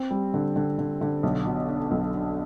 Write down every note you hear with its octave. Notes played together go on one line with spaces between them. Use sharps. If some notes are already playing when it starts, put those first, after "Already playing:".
Already playing: C4
G3
D3
D3
D3
D3
B1
B2
D4
B1
D4